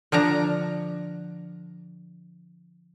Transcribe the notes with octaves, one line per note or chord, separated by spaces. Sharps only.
D3 F3 D4 A#5